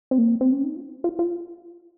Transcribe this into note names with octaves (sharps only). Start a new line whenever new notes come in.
C4
A#3
C4
C#4
D#4
F4
F4
F4